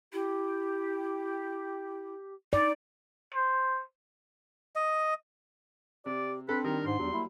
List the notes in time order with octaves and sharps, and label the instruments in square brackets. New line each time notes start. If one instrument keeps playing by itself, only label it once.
[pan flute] E4 [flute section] G4
[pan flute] D#4 [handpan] D5
[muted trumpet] C5
[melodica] D#5
[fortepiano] C3 [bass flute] G4 [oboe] D5
[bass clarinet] C4 [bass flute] D4 [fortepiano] A4 [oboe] B4
[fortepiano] D#3 G3 [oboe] A#4
[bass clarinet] G#2 [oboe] C6
[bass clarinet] E2 [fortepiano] F#3 G3
[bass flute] A#3 [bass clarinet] E4